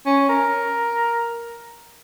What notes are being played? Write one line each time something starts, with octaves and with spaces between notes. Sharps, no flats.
C#4
A#4